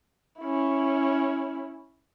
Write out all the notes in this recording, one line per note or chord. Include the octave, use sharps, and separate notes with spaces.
C#4 E4